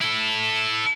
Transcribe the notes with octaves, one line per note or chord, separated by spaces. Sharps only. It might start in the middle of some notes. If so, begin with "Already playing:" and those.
E4 A4